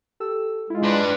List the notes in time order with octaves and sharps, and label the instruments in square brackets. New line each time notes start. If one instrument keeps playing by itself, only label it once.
[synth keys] G4 A4 E6
[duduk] G#3 [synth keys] E4 F4
[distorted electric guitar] D4 B4 [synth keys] C6 D6 A6